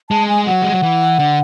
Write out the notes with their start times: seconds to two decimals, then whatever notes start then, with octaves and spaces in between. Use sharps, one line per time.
0.10 G#3 A5
0.28 G#5
0.47 F#3 F#5
0.62 G#3
0.72 F#3
0.83 E3
1.19 D3